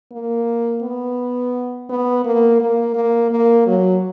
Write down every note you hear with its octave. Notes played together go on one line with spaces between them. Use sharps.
A#3
B3
B3
A#3
A#3
A#3
A#3
F#3